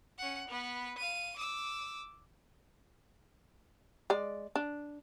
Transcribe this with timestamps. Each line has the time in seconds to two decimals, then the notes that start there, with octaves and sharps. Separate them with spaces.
0.18 C#4 F#5
0.48 B3 B4
0.98 F5 D#7
1.36 D6 E6
4.10 G#3 D5
4.56 D4